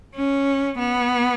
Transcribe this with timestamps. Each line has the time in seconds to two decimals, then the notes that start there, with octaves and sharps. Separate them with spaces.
0.15 C#4
0.78 B3